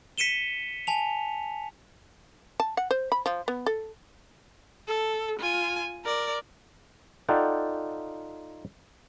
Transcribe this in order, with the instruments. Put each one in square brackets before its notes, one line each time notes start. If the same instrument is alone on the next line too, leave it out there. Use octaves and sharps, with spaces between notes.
[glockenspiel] B6 C#7 D#7 E7 G7
G#5 A5 F7
[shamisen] A5
F#5
C5
B5
F3
B3
A4
[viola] A4
F4 G#5
A#4 D5
[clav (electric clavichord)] D#4 F4 A4 D5 F#5 G5